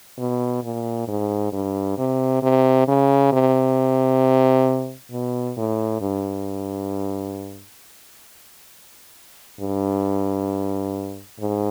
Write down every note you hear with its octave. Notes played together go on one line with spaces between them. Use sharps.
B2
A#2
G#2
G2
C3
C3
C#3
C3
B2
A2
G2
G2
G#2